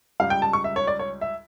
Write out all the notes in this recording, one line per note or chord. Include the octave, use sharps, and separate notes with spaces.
C#2 C#3 G3 F5
G5
A5
C#6
E5
C#5
D5
C#5
E5